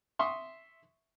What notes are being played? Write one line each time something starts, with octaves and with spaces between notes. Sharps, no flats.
E5 C6 C#6 D#6